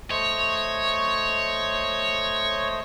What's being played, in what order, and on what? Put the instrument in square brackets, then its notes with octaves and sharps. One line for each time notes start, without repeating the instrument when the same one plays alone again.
[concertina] A3 C5 D#5 [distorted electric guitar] C#5